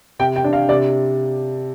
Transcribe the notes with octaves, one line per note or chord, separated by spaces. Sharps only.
C3 G5
G5
D4
F5
C3 D5